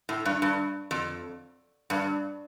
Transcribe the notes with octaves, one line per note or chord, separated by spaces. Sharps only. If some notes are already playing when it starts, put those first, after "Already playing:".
A2
G2
G2
F2
G2